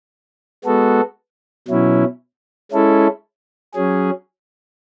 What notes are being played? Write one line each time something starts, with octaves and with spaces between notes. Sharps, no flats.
G#3 B3 F#4 A4
B2 F#3 C#4 E4
G#3 C#4 E4 A4
F#3 C#4 G#4